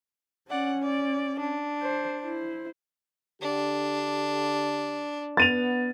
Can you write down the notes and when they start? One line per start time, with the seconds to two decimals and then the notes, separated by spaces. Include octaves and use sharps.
0.50 C#4 D5 F#5
0.82 D5
1.39 D4
1.83 C5
2.21 E4 C5
3.41 D3 D4 G4
5.37 B3 A6 D#7 F7